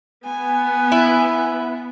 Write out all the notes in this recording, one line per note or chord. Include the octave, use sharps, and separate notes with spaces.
B3 G#5
E4